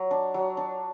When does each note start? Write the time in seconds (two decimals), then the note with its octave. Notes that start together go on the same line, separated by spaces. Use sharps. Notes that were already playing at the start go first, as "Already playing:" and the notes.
Already playing: F#3
0.11 D4
0.34 F#3
0.57 D4